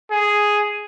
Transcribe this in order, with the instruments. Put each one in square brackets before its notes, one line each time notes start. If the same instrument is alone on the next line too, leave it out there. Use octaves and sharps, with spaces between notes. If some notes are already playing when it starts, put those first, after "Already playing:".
[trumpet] G#4